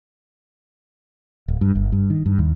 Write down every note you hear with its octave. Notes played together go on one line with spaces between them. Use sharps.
D1
G2
G1
G2
D#3
G2
D#2